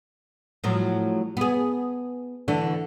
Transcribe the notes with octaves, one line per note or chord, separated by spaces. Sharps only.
A2 F3 F#3
B3 G#4
D3 E3 A3